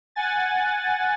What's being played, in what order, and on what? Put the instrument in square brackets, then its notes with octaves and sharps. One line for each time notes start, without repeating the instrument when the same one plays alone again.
[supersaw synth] F#5 G#5 A6